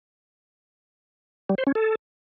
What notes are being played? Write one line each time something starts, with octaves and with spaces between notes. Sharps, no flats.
G3
C5
C#4
A4